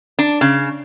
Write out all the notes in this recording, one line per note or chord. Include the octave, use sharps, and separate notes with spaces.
D4
C#3